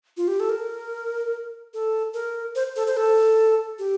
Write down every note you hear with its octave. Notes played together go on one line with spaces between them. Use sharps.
F4
G4
A4
A#4
A4
A#4
C5
A4
C5
A4
G4